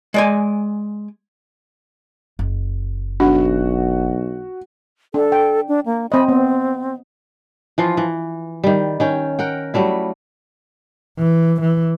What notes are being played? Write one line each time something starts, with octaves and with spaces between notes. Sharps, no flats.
G#3 D5 G#5
F#1
B1 D4 F#4
D4 A4
G5
D4
A#3
C4 D#5 B5
B3 C4
E3 F3 F4
E3
D#3 G3
D#3 C#4 G5
A#4 F#5 G5
F#3 G3 A3 E4
E3
E3